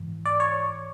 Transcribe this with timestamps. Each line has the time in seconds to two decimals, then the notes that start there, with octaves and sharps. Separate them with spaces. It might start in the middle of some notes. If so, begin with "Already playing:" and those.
Already playing: G#2 E3
0.25 D5
0.40 C#5